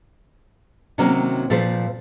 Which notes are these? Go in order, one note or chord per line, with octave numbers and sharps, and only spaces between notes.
C3 D#3 F#3 A#3 C4 C#4
A#2 F3 A4 B4 C5